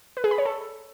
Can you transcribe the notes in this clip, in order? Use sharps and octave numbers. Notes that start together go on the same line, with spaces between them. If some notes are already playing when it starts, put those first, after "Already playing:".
B4
G#4
B5
C#5
A4